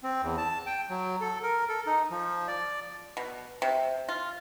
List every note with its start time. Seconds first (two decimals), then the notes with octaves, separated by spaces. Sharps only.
0.03 C4
0.22 E2
0.37 A5
0.66 G5
0.90 F#3
1.21 A4
1.43 A#4
1.69 A4
1.86 D#4
2.11 F3
2.48 D5
3.17 B2
3.62 C3
4.09 F4